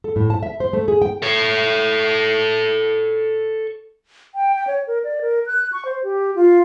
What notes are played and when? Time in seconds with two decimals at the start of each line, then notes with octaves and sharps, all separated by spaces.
0.04 A4
0.16 A2
0.30 A5
0.43 E5
0.60 C5
0.73 A3
0.88 G#4
1.02 G5
1.22 A4 C#5
4.35 G5
4.56 G5
4.67 C#5
4.87 A#4
5.04 D5
5.21 A#4
5.46 F#6
5.72 C#6
5.85 C5
6.04 G4
6.35 F4